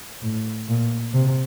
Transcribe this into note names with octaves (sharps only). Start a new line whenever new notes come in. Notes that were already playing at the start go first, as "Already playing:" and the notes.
A2
A#2
C3